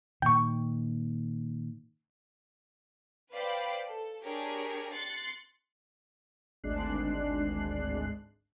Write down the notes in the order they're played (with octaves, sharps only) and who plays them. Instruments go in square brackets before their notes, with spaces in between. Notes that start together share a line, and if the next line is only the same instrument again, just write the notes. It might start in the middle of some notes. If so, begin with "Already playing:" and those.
[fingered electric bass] A#2 D#3 [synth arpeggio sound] G5 C#6
[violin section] B4 C5 D5 F5 G5 B5
A4
D4 G4 G#4 A#4 C#5
C6 F#6 A6 C#7
[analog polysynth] G#1 D2 G#3 D4 F#6 C7